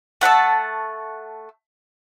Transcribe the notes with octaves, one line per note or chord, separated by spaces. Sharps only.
A3 F#5 A5 E6